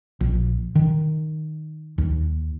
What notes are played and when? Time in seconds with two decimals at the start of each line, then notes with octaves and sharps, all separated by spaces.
0.21 A#1
0.75 D#3
1.98 D#2